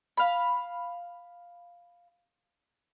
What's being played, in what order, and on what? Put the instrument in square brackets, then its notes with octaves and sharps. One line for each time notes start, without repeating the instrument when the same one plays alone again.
[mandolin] F5 B5